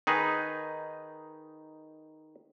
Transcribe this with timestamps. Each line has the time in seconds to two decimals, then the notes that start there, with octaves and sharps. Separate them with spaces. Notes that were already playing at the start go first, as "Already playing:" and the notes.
0.07 D#3 D#4 G#4 B4